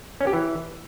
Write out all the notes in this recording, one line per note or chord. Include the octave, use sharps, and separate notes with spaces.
C#4
G4
E3